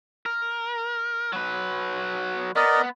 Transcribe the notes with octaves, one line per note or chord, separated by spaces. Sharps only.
A#4
F#3 B4
B3 A#4 D5 D#5